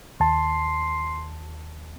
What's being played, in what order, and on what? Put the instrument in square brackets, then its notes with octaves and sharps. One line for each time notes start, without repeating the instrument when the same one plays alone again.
[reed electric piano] D#2 A5 [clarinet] C6